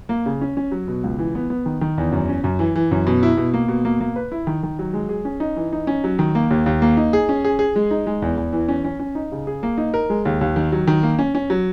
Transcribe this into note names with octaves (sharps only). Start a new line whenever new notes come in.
A#3
C#3
C#4
C#4
F#3
B2
C#2
E3
B3
B3
D#3
D#3
E2
F#2
C#4
F#2
E3
E3
F#2
B2
E4
B2
A#3
B2
A#3
A#3
B4
E4
D#3
D#3
F#3
G#3
G#4
C#4
D#4
E3
D#4
C#4
F#3
D#3
A#3
D#2
D#2
A#3
D#4
G#4
C#4
G#4
G#4
G#3
D#4
G#3
E2
E2
E3
C#4
C#4
C#4
D#4
C#3
G#4
A#3
D#4
A#4
G#3
D#2
D#2
D#3
F#3
D#3
A#3
C#4
C#4
F#3